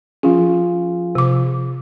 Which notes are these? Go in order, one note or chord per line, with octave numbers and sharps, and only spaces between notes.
F3 C#4 F4 G#4
C3 D6